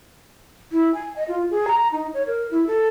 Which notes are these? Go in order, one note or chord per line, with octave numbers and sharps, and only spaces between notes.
E4
G#5
D#5
F4
G#4
A#5
D#4
C#5
A#4
E4
A4